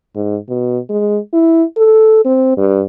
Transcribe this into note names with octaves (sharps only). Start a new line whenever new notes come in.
G#2
B2
G#3
E4
A4
C4
G2